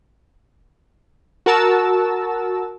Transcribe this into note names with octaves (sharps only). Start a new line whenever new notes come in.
F#4 A#4 A5 E6